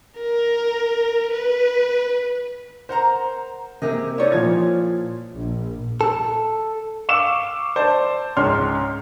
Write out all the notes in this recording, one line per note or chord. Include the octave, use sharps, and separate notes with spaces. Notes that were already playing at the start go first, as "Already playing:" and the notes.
A#4
B4
A#4 C5 F#5 A#5
C3 A#3 G4 G#4 D#5
C#4 D#4 E4 C#5 D5
A#2 F3 F4 G#6
A#1
A4
F5 C#6 D6 E6 E7
C5 D5 A5
C#2 G#2 C#5 C6 F6